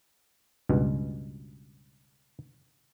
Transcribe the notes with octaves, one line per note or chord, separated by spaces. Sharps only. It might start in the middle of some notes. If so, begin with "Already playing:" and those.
C#2 G2 B2